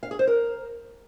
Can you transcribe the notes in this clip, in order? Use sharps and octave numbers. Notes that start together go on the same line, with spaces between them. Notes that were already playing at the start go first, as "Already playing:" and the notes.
F5
G#4
C5
A#4